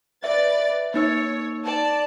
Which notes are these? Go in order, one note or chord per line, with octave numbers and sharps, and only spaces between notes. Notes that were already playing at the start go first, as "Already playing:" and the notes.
B4 D5 E5 A6
A#3 D#4 C#5 E6
D5 A5